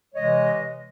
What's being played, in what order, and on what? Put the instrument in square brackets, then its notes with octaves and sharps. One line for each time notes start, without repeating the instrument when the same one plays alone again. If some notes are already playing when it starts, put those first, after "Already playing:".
[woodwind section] C3 E3 G#3 C#5 D#5